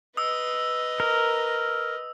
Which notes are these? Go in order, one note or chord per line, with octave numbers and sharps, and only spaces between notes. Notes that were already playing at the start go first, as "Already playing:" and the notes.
B4 D#5 D#6 E6
A#4